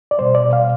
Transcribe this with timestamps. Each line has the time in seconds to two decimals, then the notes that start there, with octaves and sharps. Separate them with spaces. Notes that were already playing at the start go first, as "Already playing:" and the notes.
0.11 D5
0.18 B2 G3 C5
0.35 D5
0.53 F5